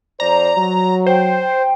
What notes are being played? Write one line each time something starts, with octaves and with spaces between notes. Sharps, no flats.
F2 C5 D5 A#5
F#3
C5 G5